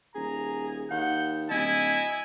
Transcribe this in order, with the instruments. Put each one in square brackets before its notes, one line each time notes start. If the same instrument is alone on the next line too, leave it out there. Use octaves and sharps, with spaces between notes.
[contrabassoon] D#1 [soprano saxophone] G#4 [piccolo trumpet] A#5
[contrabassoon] D#2 [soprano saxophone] F#5 [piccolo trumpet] G6
[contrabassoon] D1 [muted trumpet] E4 [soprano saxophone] D#5 [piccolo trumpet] G#5